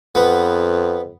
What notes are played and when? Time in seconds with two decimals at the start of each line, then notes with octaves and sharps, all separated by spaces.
0.15 F2 B3